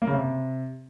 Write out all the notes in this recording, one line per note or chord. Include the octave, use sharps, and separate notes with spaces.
A#3
C#3
C3